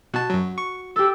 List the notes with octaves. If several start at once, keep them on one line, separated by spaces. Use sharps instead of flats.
B2 F#4 A5
F#2 F#3
C#6
G4 A4 E6